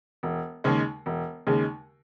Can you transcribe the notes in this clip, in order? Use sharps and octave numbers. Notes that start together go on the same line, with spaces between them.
E1
D#2 C#3 G#3
E1
D#2 C#3 G#3